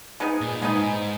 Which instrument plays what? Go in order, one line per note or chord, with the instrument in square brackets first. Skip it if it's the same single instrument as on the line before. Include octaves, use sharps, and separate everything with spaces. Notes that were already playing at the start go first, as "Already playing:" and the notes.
[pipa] G#3 B3 D#4 G#4
[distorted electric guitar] A#2
[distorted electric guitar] G#2 [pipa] G#3 B3 D#4 G#4